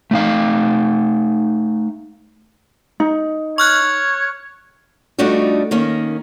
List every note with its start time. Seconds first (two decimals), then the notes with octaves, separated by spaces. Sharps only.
0.11 A3 D#4 F5
3.00 D#4
3.58 C#5 C#6 F6 F#6
5.19 G3 A3 D4 D#4 F4 F#4
5.71 D#3 A#3 C#4